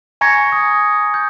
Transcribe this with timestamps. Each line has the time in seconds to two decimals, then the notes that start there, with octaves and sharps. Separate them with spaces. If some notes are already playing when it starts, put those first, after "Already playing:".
0.21 G#5 A#5 C#6 G#6 A#6 C#7
0.52 D#6
1.14 G6